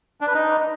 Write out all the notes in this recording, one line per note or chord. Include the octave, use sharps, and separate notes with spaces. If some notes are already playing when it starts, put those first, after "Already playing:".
D4
B4
D#4